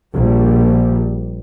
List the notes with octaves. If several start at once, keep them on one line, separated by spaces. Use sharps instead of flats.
A#1 G3